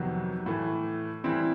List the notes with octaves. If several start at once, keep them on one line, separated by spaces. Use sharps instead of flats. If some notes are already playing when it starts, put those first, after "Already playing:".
Already playing: F2 C3 D#3 F#3 B3
A2 E3 A3
E3 G3 C4 E4